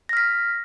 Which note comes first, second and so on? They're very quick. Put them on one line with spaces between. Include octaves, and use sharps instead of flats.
A#6 F6 B6